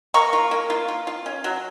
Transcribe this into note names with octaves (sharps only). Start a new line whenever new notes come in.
A#3 A#5 C#6
F4
A#3
F4
F4
F4
C#4
F#3